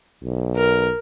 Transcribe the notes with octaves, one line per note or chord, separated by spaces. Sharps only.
B1
A#4